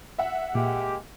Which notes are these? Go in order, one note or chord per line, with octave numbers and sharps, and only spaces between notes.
E5 F#5
A#2 G#3 A#3 G4